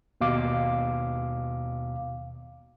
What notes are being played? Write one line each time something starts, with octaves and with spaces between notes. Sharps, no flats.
D#2 B2 F5 D6